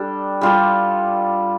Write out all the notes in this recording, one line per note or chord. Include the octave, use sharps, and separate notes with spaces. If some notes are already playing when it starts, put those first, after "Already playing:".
Already playing: G3 D4 A4
G3 F4 A4